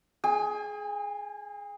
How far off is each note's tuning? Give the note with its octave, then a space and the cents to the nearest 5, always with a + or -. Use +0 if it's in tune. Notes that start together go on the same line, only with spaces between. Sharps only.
G#4 +15 G#5 -40